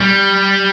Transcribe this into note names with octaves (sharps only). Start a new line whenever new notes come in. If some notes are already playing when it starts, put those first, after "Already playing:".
G3